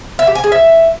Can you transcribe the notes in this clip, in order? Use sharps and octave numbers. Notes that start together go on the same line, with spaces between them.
E5
G4
G#5
G#4
E5